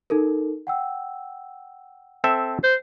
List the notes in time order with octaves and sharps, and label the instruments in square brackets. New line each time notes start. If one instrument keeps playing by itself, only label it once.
[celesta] D#4 A4 A#4
F#5 G5 E6
[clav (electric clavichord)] C4 A4 E5
[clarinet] C5